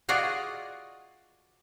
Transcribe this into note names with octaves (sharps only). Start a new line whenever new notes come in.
F4 F#4 G#4 D5 D#5